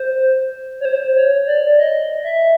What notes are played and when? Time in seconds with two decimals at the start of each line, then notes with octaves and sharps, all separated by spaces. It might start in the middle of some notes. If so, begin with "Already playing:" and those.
Already playing: C5
0.80 C#5
0.85 C5
1.16 C#5
1.47 D5
1.78 D#5
2.24 E5